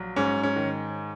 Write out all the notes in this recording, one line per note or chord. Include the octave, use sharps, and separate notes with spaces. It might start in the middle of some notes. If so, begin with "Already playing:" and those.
Already playing: A#1 F#3
G#2 C#4
C#4
D#3